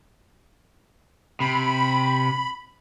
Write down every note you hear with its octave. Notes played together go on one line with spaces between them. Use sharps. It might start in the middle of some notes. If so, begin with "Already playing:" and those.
C3 B5